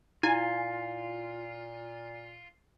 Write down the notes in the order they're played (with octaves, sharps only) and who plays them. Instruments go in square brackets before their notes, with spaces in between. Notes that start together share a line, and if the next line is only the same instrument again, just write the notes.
[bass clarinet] A#2 [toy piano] E4 [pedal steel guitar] F4 [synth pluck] G#5